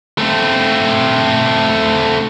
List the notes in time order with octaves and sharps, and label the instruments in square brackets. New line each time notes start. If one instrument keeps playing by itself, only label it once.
[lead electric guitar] A3 C4